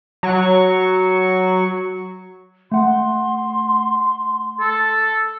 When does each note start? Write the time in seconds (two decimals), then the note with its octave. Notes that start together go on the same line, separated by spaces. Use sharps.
0.23 F#3 C#6
2.72 A3 F#5 C6
4.60 A4